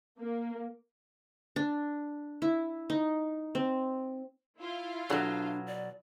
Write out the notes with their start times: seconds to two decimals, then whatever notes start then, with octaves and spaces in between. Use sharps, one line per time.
0.18 A#3
1.56 D4
2.42 E4
2.90 D#4
3.55 C4
4.58 E4 F4 F5
5.10 B2 F3 F#3 D4 A4 B5
5.67 D5